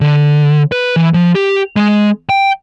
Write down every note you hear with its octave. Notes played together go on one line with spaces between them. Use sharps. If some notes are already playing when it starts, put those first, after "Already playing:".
D3
B4
E3
F3
G4
G#3
G5